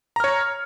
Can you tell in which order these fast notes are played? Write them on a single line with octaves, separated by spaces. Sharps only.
A#5 F6 C#5